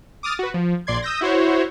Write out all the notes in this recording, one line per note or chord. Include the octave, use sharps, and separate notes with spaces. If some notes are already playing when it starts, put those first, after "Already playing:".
D6 D#6 F6 A6
F#4 B4
F3
A#1 D5 C6 G#6
D#6 E6 G6 A#6
E4 F#4 C5 C#5